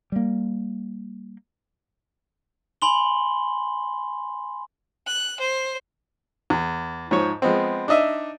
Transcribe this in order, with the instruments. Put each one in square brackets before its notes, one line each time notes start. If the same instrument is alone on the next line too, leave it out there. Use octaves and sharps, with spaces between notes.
[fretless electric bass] G3 A#3
[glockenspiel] G#5 B5 C6 F#7 G7
[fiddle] F#6
C5
[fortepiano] E2
G#2 F3 C#5
F3 G#3 B3 C4
D4 D#4 D#5 E5